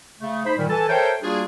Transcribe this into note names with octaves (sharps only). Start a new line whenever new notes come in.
C#3 A3
D#4 C5 B5
A#2 D#3 G3
E3 A4 G#5 A5
A4 A#4 C5 C#5 E5 G5
G3 A#3 D4 F4 F#4 G#4